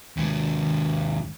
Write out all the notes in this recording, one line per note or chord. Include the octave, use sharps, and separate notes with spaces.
D#2 G#3